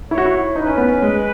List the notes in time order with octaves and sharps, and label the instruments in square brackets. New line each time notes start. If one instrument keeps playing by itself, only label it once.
[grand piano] E4 [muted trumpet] C#5
[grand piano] F#4
E4
[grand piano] D#4 [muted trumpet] B4
[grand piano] C#4
B3
C#4
G#3